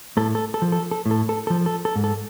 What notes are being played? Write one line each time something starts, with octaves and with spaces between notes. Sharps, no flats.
A2 A4
A4
A4
F3
A4
A4
A2
A4
A4
F3 A4
A4
A4
G#2
A4